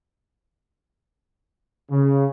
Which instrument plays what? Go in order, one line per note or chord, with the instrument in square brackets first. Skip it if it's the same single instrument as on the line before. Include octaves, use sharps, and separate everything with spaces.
[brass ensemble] C#3